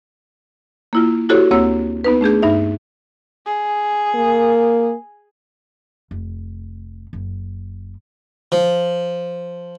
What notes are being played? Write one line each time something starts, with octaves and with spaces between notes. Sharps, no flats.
A#3 E4 F4
E4 F#4 G4 A4 C5 C#5
D2 A#3 C4 C#5 E6
B3 D#4 B4
A3 D4 G#4 G6
G2 D#4 E5
G#4
A#3
F1
F#1
F3